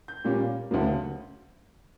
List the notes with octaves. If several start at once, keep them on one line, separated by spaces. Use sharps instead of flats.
G6
A#2 G3 A#3 C#4
D2 C#3 F#3 A#3